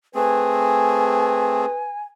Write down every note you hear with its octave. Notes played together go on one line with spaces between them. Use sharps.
A3 C4 G#4 B4 G#5